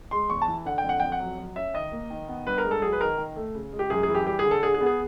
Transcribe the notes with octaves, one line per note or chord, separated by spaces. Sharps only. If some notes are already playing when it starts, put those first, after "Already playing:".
G#3 C6
E2 C#6
A5
E3
D3 F#5
G5
F2
F#5
F2 G5
F#5
F#3
F#3
C#4 E5
D#3 D#5
A#3
D#3
B3
G2 B4
A#4
G#3
A4
F#3 G#4
B4
D#3 A#4
D#3
A3
C#3
G#3
G4
F#2 G#4
G#4
E3
G4
G3 G4
G#4
D3
A4
D3 G#4
G#4
B3
G#4